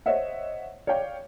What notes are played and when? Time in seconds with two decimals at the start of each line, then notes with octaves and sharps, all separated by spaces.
0.06 C5 C#5 D#5 E5 F#5
0.87 C#5 D5 F5 G5